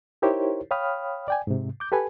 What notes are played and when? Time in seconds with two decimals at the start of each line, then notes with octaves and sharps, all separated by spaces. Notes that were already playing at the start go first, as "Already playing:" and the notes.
0.22 D#4 E4 G4 A#4 C5 C#5
0.71 C#5 F5 G5 B5 D#6 F6
1.28 D5 G5 G#5
1.47 G#2 C3
1.80 D6 G6
1.92 G4 A4 B4 G#5